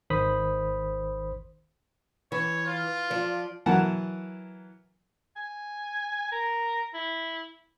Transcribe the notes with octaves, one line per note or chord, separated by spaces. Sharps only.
G#1 D#3 C5 B5 D#6 B6
E3 C#5
F4
F3 D5
E3 F#3 A#4 F#5 A5
G#5
A#4
E4